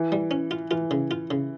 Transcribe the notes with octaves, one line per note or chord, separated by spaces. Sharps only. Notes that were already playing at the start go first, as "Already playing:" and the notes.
Already playing: E3
G3
C#4
F4
E3 F4
C#3
F4
C#3